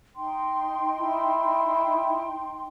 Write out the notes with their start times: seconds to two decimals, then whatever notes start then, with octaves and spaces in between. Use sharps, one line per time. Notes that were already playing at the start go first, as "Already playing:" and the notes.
0.16 D#4 G5 C6
0.99 E4